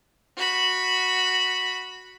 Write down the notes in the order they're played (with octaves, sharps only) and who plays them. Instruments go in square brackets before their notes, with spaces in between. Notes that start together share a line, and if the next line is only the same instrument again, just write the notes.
[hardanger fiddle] F#4 B5